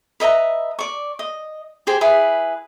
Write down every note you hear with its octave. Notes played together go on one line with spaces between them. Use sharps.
B4 D#5 E5 A#5
D5 C#6
D#5
G4 G#4 C5 G#5
E4 G#4 B4